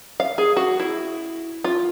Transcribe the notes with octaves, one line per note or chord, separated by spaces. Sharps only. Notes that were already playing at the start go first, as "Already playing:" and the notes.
F5
G#4
F#4
E4
F4